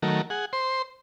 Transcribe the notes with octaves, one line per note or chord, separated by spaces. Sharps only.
D#3 F#3 A3 A#4
G#4 F#5
C5 C6